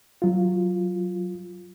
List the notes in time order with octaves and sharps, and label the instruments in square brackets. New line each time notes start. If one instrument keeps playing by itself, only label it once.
[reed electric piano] F#3 F4